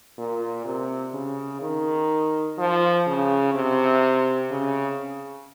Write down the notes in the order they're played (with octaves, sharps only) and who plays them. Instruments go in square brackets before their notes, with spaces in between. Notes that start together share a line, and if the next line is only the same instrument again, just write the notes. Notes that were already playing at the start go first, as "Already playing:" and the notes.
[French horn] A#2
C3
C#3
D#3
F3
C#3
C3
C#3